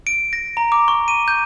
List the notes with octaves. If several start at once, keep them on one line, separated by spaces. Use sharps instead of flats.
D7
A#6
A#5
D6
C#6
D#7
G6